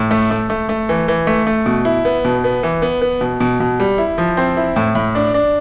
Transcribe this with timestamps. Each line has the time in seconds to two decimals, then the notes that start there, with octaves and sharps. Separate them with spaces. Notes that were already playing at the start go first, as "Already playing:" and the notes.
Already playing: A2
0.11 A3
0.31 A3
0.50 A3
0.69 A3
0.89 E3
1.08 E3
1.27 A3
1.47 A3
1.66 B2
1.85 E4
2.05 B3
2.25 B2
2.44 B3
2.63 E3
2.82 B3
3.01 B3
3.21 B2
3.40 B2
3.60 B2
3.80 G3
3.98 E4
4.18 F3
4.37 C4
4.57 E4
4.76 A2
4.95 A2
5.15 D4
5.34 D4